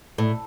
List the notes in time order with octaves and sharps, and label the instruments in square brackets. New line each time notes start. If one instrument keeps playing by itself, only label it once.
[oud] A2